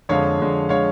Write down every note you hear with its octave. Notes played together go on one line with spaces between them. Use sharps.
F2 D3 G#3 C#5 F5
F2 D3 G#3
D3 G#3 C#5 F5